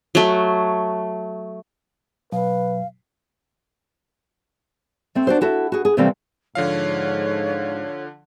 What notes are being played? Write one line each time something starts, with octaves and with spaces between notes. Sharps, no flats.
F#3 A3
B2 F#3 B4 F5
A3 C4
D4 F#4 C5
E4 F#4 A4 E5
F#4 G#4
G#4
C3 E3 G3 A3 C4 F5
G#2 D3 F3 C#5 F5